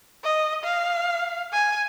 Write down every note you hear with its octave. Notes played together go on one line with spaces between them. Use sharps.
D#5
F5
G#5